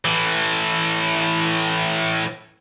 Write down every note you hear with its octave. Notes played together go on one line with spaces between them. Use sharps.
A2 E3